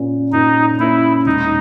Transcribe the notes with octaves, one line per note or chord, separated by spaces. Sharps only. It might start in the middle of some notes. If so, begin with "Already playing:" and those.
Already playing: A#2 A#3 C#4
A#2 D#4
A#3 C#4 E4
E1 D#4